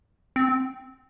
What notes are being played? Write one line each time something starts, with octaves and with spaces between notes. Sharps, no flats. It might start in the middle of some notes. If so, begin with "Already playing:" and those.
C4